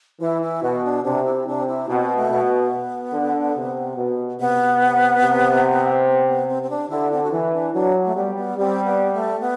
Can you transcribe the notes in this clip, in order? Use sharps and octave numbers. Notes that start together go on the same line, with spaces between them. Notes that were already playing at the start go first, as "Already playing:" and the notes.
E3 E4
E4
B2 F#4
D4
C3 D4
E4
C3 D4
E4
B2 C4
A3
B2
B3
D3
C3
B2
C3 B3
C3
B3
B3
C4
C4
D4
D3 E4
C4
F#4
E3 E4
D4
F#3 D4
A3
G3 B3
B3
G3 C4
B3
A3
B3